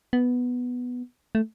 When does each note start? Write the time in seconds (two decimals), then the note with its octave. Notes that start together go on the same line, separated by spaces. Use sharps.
0.13 B3
1.35 A3